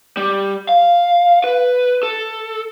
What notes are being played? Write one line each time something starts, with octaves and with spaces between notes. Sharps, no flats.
G3
F5
B4
A4